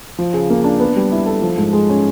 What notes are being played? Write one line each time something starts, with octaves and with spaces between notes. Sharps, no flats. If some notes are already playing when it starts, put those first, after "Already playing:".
F3
C#3
A#3
D4
B3
G3
E4
A4
F3
G#2
G#3
C#4